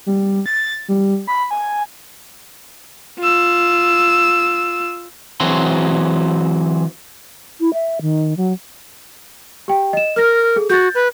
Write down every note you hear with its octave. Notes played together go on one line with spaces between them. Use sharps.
G3
A6
G3
B5
G#5
F4 E6
E3 F#3 C4 F#4 G#4 C6
E4
E5
D#3
F#3
G4 G5
D#5 E7
A#4 F6 A#6
G#4 A4
F#4 G6 A6
B4